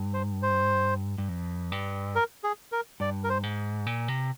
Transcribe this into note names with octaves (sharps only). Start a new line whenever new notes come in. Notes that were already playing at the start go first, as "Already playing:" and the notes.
Already playing: G2
C5
C5
G2
F2
G2
A#4
G#4
A#4
G2 D5
A#4
C5
G#2
A#2
C3